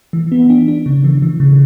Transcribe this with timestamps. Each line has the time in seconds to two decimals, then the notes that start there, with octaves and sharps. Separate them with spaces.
0.13 E3
0.32 B3
0.50 D4
0.68 D4
0.86 C#3
1.04 E3
1.22 E3
1.40 C#3